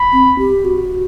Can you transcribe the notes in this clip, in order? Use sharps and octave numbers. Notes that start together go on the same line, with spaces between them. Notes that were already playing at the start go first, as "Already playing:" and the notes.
Already playing: B5
C4
G4
F#4